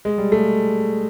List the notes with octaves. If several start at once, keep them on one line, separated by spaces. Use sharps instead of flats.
G#3
G3
A3